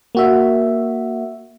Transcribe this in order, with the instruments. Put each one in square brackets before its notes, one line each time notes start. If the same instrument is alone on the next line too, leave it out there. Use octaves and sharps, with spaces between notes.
[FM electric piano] A#3 F#4 E5